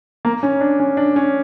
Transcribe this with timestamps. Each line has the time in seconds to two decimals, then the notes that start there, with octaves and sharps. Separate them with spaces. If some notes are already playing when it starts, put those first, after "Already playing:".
0.25 A#3
0.43 C#4
0.61 D4
0.80 C#4
0.97 D4
1.16 C#4